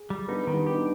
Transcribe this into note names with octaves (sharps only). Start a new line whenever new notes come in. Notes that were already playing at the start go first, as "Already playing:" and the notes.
Already playing: G#4
G3
B3 D4 D#4
D#3
G3 B3
D#4 G4
B3 D4